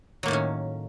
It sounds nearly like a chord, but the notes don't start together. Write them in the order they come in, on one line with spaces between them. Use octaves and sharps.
F#3 A#3 A2 D#3 C#4